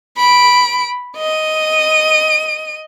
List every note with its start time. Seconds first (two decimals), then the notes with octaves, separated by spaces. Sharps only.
0.17 B5 D7
1.17 D#5 D#7